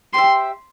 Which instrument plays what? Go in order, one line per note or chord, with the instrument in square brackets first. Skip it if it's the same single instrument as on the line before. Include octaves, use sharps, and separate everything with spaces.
[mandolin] G4 C5 E5 [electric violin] C6